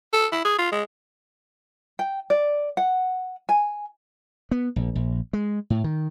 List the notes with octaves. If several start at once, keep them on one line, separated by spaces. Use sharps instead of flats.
A4
E4
G#4
F4
G#3
G5
D5
F#5
G#5
B3
A#1
A#1
G#3
A2
D#3